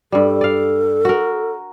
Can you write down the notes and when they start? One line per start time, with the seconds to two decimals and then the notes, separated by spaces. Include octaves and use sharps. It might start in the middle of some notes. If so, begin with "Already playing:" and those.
0.12 G2 G3 A4
0.41 D5 F5
1.05 F#4 A#4